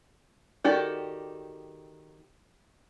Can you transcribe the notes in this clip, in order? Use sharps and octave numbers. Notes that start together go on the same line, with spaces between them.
D#3 F#4 G4 A4 D5